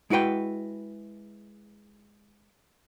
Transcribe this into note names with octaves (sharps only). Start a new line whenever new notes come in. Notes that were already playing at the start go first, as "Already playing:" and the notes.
G#3 E4 F#4 B4 G5